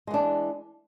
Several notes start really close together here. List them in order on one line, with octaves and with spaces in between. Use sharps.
G#3 E3 D4